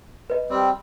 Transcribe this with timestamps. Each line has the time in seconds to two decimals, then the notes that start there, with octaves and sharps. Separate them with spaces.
0.30 B4 D#5
0.50 G3 C4